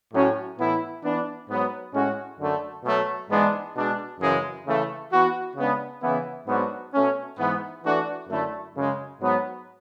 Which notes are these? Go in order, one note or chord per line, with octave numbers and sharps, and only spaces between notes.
A2 F#3 C#4 F#4
A2 E3 B3 E4
E3 B3 D4
G#2 F#3 B3
A2 G#3 C#4 F#4
F#2 D3 A3
B2 F#3 A3
G#2 E3 G#3 B3 D4
B2 G#3 D4
F#2 C#3 E3 G#3
C#3 E3 A3
E3 B3 F#4
C#3 G#3 B3 D4
C#3 E3 B3 E4
G#2 F#3 B3 D4 F#4
B2 A3 C#4
G#2 E3 B3
E3 A3 D4 F#4
F#2 D3 A3 E4
F#2 C#3 G#3
G#2 F#3 B3